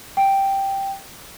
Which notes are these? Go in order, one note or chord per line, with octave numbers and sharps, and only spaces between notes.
G5